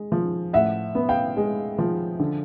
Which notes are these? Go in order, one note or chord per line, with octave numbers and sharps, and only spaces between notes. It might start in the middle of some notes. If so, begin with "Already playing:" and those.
Already playing: G#3
F3
A2 E5 F#5
B3
F5 G5
G#3
F3
D3